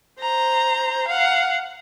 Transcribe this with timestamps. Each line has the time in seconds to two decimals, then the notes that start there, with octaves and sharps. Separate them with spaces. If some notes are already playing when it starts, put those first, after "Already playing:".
0.19 C5 A#5
1.08 F5 F#5